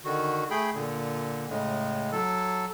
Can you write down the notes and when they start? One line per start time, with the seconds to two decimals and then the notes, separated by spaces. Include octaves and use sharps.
0.05 D3 D#3 F#4
0.51 A3 G#4 G5 B5
0.75 A#2 D3
1.49 A2 C#3 G#3
2.12 F#3 A4